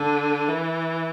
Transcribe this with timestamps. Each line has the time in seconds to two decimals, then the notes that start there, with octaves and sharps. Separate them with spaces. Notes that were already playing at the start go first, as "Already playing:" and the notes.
Already playing: D3
0.49 E3